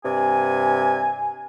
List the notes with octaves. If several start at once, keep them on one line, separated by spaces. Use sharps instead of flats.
G2 C3 G#5